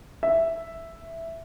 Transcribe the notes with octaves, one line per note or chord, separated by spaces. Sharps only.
E5